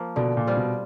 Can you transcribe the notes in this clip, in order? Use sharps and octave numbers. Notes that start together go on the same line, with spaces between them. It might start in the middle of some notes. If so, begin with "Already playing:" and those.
Already playing: F3 A#3
B2 D3
A#2
G3 C4 F4
B2